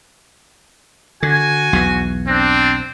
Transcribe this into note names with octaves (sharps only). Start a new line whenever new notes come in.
D3 F#4 G#5
B1 E2 B2
C4 D4